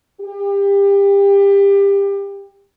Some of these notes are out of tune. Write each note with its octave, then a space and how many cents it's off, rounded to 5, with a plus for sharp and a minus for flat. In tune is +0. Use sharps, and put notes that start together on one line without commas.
G4 +25